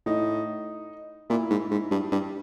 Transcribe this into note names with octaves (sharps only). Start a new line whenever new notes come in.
A2 D#4
A#2 E4
G#2
G#2
G2
G2